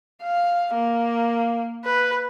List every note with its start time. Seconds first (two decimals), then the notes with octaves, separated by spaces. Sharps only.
0.23 F5
0.74 A#3
1.84 B4